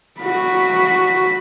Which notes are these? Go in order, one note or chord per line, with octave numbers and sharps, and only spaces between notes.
F#4 B5